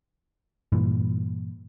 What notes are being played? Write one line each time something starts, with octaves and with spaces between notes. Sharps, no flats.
G2 A#2 E3